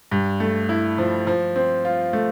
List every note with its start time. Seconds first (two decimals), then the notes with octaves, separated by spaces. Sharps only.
0.11 G2
0.40 A3
0.69 E4
0.98 F3
1.27 F3
1.56 C4
1.85 F4
2.13 A3